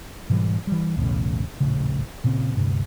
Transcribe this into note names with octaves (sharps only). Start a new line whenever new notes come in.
G#2 B2 E3 G3
E3 G3
B1 E2 A2 C#3
D#1 A#1 A2 C#3
A#2 C#3 C4
D2 G2 C3